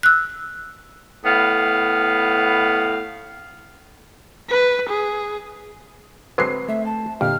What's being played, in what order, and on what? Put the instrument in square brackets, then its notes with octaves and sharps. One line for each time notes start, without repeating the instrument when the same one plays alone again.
[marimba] E6 F#6
[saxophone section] A2 B3 F5
[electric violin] B4
G#4
[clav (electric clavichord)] D3 F#3 G#3 [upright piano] C4 C7 [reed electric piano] B4
[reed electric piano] A3 [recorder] E5
[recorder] A5
[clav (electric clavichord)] F2 [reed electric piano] A#2 D3 G4 [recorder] F6